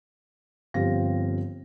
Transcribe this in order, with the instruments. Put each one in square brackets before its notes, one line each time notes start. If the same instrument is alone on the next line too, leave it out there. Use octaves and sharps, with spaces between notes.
[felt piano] G1 F3 C4 G4 F5 A#6